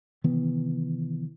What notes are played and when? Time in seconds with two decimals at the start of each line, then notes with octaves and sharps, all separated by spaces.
0.24 C3 D#3 E3 B3